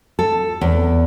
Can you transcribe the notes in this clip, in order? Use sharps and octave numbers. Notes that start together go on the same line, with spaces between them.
A4
E2